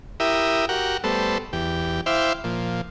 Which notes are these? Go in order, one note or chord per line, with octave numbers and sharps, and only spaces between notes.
E4 G4 A#4 E5 D#6
F#4 G4 A#4 F#5
G3 A3 B3 A4 C5
E2 G4
E4 C5 E5 F5 G5 D6
A#2 F3